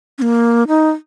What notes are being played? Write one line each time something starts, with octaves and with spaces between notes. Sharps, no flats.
C#4
A#3
D#4